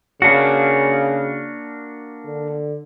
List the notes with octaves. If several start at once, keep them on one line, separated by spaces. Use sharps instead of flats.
C#3 A#3 D4 F#4
D3